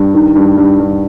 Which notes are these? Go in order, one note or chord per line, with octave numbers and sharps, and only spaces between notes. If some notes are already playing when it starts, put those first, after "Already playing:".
Already playing: G2
D#3
G2
G2
G2